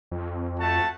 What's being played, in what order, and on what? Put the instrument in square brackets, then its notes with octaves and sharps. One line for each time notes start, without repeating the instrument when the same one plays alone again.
[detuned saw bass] F2
[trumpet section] A3 F#4 A5